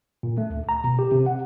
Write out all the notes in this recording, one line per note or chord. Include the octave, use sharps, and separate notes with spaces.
A#2
A3
D2
A#5
B2
G4
C3
F#5